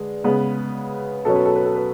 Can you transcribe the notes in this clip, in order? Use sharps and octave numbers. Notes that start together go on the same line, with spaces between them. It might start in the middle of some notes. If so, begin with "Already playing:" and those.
Already playing: D3 G#3 B4
C#3 G#3 B3 B4
B2 F#3 C#4 A4
B4
A4
B4
A4
B4